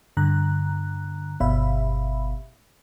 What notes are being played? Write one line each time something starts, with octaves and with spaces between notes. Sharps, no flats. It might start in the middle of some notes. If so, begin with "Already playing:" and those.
G2 D3 A#5 F#6
G1 B2 E5 F5 B5